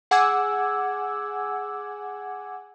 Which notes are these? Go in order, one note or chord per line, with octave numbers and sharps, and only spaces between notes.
G#4 F#5 G#5 D6 E6 G#6